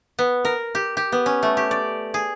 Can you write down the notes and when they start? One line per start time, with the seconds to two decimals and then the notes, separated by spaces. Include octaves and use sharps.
0.19 B3
0.45 A#4
0.75 G4
0.97 G4
1.12 B3
1.26 C#4
1.43 A3
1.57 G4
1.71 D5
2.14 G#4